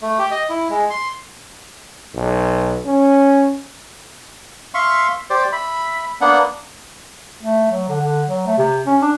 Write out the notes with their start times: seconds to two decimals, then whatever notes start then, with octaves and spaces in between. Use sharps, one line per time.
0.02 A3
0.19 G4
0.31 D#5
0.49 E4
0.70 G#3
0.90 C6
2.15 B1
2.86 C#4
4.74 E5 F5 C6 C#6
5.30 G4 C5 D5
5.52 E5 B5
6.21 A#3 B3 D4 F#5
7.43 A3
7.72 F#3
7.89 D3
8.01 D3
8.27 F#3
8.47 A3
8.58 C3
8.86 C#4
9.02 D4